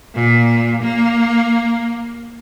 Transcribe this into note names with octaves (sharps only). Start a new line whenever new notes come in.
A#2
A#3